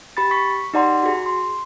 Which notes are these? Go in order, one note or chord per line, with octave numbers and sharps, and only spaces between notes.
G4 B5 A6
C#6 B6
D#4 G4 D5 F#5 A#5 C6
F#4 G#4
C6